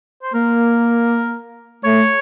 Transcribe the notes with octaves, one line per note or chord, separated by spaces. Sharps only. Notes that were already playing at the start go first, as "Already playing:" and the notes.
C5
A#3 A#4
A3 C#5